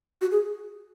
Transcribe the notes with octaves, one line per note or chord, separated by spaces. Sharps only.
F#4
G#4